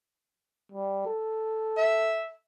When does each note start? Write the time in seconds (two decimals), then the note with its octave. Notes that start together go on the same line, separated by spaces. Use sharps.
0.72 G3
1.06 A4
1.78 E5